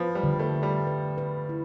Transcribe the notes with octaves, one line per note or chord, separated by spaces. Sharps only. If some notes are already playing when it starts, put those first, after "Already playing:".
Already playing: F3 B4
G3
D3
A3
A3
G3
B4
B4
E4